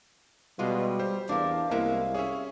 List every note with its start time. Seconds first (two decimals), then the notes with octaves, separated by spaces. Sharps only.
0.59 B2 G3 G#3 F4
0.99 G4 C5
1.29 E2 D4 E4 A#4 F5
1.71 C2 G#3 A#3 B3 E4 A#4 E5
2.14 C#4 G#4 C#5 E5